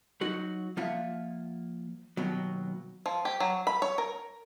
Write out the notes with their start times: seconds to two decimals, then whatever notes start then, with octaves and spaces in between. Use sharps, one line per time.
0.21 F#3 D#4 F#4
0.77 F3 A#3 F4 E5 F#5
2.17 D#2 B2 F#3
3.06 F3
3.25 G4
3.40 F#3
3.67 B5
3.82 C#5
3.98 A#4